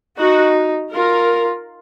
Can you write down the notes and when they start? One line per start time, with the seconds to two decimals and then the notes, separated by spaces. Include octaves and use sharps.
0.19 D#4 F#4
0.94 F4 A#4